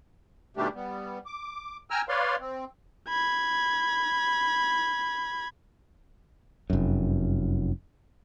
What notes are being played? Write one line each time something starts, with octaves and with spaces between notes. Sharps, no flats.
B2 D#3 G3 A3 D4 G4
G3 B3
D6
G5 G#5 A#5 E6 F6
B4 C#5 D5 F5 C6
C4
B5 G#6
F1 F#2